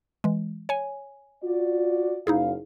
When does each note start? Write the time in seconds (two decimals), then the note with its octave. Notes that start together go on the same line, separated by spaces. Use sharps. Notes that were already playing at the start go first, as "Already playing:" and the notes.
0.24 E3 G#3
0.69 C#5 G#5
1.43 F4 F#4 D5
2.27 F#1 D#4 E4 G#4 F5